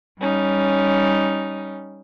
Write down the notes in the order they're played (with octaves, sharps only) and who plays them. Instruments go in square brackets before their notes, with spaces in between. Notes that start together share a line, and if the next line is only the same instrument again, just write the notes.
[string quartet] G3 C#4 D#4